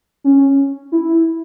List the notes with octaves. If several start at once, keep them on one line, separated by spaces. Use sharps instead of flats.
C#4
E4